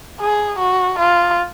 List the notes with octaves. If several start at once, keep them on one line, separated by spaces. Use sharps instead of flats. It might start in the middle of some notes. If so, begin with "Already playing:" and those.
G#4
F#4
F4